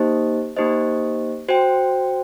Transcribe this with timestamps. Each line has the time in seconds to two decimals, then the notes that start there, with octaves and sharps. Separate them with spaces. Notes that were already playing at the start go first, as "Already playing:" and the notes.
Already playing: A#3 D#4 G4 C5 D#5
0.56 A#3 D#4 G4 C5 D#5
1.49 F#4 C5 G5